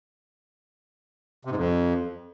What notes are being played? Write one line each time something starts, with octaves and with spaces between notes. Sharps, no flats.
C3
G#2
F2